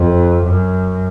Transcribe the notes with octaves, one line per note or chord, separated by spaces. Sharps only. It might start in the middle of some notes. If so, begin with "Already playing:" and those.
Already playing: F2
F#2